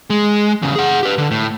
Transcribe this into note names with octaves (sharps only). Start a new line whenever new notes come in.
G#3
E2 C#3
G#4 F#5
G4 B4
D3
A2